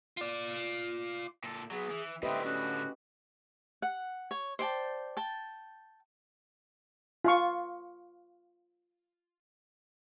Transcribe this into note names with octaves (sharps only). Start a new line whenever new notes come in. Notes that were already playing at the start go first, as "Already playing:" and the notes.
F4 D5
A#2 A4
F#3 B3 G#4
E3
A2 D3 C4 G4 B4 D#5 E5
C#4 F#4
F#5
C#5
C5 D5 G5 A5
G5 A5
F4 F5 C#6